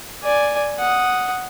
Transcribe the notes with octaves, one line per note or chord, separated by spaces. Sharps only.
D5 G#5
F#5 D#6